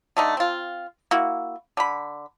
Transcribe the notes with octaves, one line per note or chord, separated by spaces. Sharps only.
D3 A3 D#4
C4 F4
A#3 E4 F#4
D3 B5